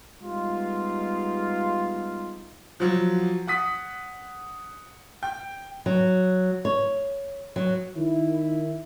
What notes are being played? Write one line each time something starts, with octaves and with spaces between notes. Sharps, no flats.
G3 G#3 B3 D#4 F4
F3 F#3
F#5 D#6 B6
G5
F#3
C#5
F#3
D#3 E4